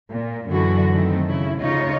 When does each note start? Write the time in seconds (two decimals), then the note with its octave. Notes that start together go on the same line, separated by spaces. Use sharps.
0.11 A#2
0.48 F#2 D3 E3 F#4
0.93 D#3 A3 C4
1.27 C#3 E4
1.59 D2 C#3 D#4 F4 C#5